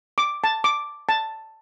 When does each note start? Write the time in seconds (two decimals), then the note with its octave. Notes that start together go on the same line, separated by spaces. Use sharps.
0.18 D6
0.44 A5
0.64 D6
1.09 A5